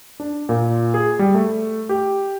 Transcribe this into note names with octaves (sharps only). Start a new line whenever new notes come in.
D4
A#2
G#4
G3
A3
G4